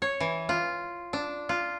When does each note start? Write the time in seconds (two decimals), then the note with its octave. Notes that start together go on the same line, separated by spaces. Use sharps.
0.02 C#5
0.20 E3
0.49 F4
1.13 D4
1.49 F4